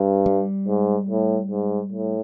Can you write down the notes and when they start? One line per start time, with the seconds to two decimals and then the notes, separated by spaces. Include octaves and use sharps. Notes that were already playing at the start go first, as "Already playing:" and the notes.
Already playing: G2
0.26 G3
0.67 G#2
1.09 A2
1.51 G#2
1.92 A2